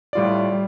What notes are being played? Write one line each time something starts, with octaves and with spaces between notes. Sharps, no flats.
A2 G3 F4 D5
G3